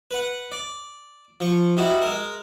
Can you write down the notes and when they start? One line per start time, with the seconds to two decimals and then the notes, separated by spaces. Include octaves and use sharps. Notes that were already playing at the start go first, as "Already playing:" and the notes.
0.11 B4 F#5
0.52 D5
1.40 F3 C#6
1.77 G3 D#4 E4 F#4
2.02 G#3 A#4